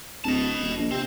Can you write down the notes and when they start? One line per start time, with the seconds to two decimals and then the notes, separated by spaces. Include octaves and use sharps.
0.24 D1 D#5 A5
0.61 D#1
0.77 A#1
0.91 C3 C4